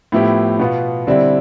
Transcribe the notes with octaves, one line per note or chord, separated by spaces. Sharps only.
A2 F3 B3 E4 G4
B2 B3 F4
D3 G3 C4 E4